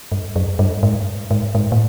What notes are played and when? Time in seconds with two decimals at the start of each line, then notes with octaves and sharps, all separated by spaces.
0.12 G2
0.36 F#2
0.59 G2
0.83 G#2
1.31 G#2
1.55 G#2
1.72 A2